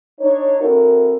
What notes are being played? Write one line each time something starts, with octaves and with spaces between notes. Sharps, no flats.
D4 D#4 C#5
C4 E4 F#4 A4 A#4